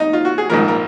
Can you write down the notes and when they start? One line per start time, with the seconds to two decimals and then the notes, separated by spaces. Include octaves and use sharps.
0.00 D#4
0.13 F4
0.25 F#4
0.38 G#4
0.50 A#1 G#2 F3 A#4
0.68 A#4